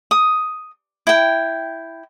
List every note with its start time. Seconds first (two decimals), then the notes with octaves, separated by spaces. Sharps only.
0.11 D#6
1.07 E4 G5